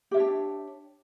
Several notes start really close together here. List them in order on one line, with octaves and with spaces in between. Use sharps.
G4 E5 C#5 D4